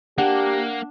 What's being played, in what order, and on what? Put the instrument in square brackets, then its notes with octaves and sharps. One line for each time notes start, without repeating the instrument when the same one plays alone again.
[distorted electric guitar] A#3 [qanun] D4 [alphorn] G4 [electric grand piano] F#5